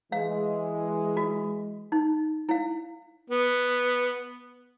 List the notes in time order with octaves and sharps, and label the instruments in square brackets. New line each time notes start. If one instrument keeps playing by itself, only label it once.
[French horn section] E3 G#3 [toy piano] F5
[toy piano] F#4
D#4
E4 F5
[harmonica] B3